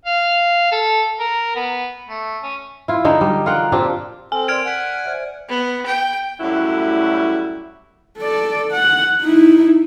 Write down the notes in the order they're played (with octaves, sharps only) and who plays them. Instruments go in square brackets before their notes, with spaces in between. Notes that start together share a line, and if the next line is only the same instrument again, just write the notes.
[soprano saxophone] F5
A4
A#4
B3
A3
C#4
[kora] E4 F4
D3 G#3 D#4
G3
F4 A#4 F#5 G5
A#2 C4 D4 G4
[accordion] C4 [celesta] A4 [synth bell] G#5
[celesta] A#4 D5 C6 [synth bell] F6 G#6 D7
[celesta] D5 B6 F#7 [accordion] F#5 G#5
[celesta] C5 D5 E5
[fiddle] B3
G5
[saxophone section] F#2 A2 G3 A3 E4 F#4
[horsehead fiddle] A4 D5
F#5
D#4 E4